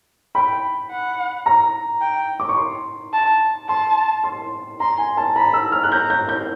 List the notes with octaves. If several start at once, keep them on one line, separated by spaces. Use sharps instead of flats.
G5 B5
F#5
A#5
G5
D6
C#6
C6
A5
A5 C6
C6
A#5 C6
G#5
A5
A#5 B5
E6
F6
F#6
A#5 G6
G6
G6